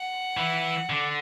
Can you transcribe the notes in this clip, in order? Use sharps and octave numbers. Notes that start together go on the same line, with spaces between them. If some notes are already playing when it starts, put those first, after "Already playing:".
Already playing: F#5
E3
D3